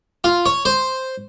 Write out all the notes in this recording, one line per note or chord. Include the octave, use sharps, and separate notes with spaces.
F4
C#5
C5